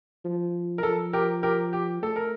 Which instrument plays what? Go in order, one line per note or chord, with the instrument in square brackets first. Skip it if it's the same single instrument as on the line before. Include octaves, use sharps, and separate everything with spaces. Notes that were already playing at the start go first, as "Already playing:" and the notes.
[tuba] F3
[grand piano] A#4
[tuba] F3 [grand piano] A4
[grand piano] G4 A#4
G4 A#4
G4
[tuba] A3 [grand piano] A4
[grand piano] A#4